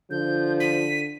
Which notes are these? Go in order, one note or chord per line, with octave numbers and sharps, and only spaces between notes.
D3 F3 G6
B6 D#7